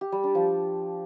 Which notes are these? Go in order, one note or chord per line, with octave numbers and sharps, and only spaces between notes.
G4
G3
D4
F3